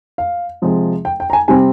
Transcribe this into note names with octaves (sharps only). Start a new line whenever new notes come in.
F5
C3 F3 G#3
G5
G5
A#5
G#5
C3 G3 C4 G#5